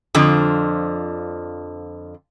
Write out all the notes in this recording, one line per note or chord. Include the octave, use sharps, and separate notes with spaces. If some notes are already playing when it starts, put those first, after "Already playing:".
F2 D3 F3